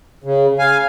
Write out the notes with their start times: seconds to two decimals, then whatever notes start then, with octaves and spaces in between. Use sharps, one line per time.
0.24 C#3
0.59 F5 G#5